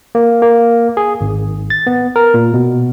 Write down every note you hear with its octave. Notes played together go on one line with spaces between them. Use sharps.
A#3
A#3
G#4
G#1
A6
B3
A#4
A#2
B2